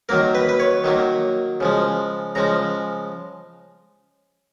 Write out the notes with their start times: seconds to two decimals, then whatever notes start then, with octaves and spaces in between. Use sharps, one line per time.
0.09 D#3 F#3 A#3 A#4
0.35 B4
0.49 B4
0.60 C#5
0.84 D#3 F#3 A#3
1.60 C#3 F3 G#3
2.35 C#3 F3 G#3 A#5